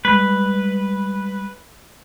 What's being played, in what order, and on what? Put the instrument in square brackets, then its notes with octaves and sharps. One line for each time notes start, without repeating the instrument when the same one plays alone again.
[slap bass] G3 G#3 [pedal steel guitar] B4